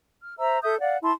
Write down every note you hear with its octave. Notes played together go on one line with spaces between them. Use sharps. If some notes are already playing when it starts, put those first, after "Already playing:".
F6
C5 E5 A#5 E6
A4 E5 D#6 G6
D5 F5 F#5
E4 A5 C6